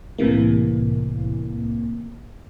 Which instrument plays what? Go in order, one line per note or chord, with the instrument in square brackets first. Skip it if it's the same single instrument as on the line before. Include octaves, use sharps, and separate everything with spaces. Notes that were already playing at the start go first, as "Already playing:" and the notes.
[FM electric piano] C2 A2 C3 E3 A#3